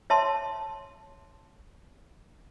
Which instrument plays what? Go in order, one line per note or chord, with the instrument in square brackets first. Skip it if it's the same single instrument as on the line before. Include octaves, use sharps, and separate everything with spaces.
[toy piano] C#5 E5 A5 C6